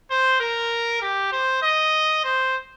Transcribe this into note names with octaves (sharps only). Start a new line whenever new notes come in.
C5
A#4
G4
C5
D#5
C5